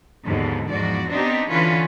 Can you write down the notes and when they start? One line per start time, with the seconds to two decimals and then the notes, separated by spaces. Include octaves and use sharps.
0.25 D#2 G#2 B2 D3 F3
0.69 E2 G#2 F3 F#4 D5
1.08 B3 C4 D4 D#4 G4
1.50 D3 E3 C#4 F4 B4